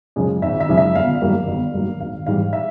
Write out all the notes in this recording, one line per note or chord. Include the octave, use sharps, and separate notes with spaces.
F#2 C#3 F3 G#3
G#1 E5
E5
F#2 C#3 F3 G#3
E5
G1 F5
G2 D#3 F#3 A#3
G1
G2 D#3 F#3 A#3
G#1 F5
G#2 E3 G3 F5
E5